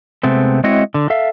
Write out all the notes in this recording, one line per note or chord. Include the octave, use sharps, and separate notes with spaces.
C3 G#3 A3 B3 C4
G#3 C4 E4 F#4 C#5 D#5
D3
A4 E5 F5